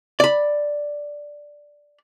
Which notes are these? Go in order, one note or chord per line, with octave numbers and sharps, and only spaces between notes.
D5 B5